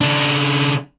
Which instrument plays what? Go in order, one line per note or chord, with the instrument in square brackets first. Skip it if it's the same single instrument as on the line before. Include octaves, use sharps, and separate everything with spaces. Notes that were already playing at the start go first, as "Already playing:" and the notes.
[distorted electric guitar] C#3 D4